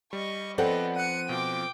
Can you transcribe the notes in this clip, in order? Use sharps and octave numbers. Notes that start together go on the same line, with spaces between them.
G3 D#5 C#6
F3 B3 C4 A4 D5 D#5 F#5 G5
F#5 F#6 C#7 D#7
B2 F4 G5 D6